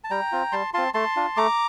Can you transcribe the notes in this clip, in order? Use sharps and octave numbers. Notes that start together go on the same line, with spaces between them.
A5
G3 G5 A#5
C4 F4
G3 A5 C6
C4 F4 A5 C6
A3 A5 C6
D4 F4
A3 A#5 D6